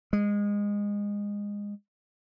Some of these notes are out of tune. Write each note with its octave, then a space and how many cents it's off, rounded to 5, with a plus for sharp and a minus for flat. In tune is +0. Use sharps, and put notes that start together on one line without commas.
G#3 -20